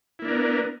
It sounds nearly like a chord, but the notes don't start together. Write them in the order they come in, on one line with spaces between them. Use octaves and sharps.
E4 A#3 D4 A#4 B3